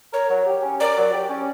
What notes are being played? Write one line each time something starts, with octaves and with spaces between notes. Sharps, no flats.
A#4 C#5
F#3
G4
C#4
A#4 D5
F#3
G4
C#4